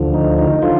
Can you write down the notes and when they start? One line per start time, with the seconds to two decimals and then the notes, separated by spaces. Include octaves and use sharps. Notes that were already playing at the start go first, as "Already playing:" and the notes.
Already playing: D2 D3 F3
0.14 D#4
0.38 D#4
0.62 D3 F3 F4